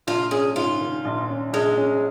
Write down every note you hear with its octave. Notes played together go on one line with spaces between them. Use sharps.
A#1 F4
C#4 G#4
G#2 F4
D#3
A#1
C#4
A#1 G#3
C#4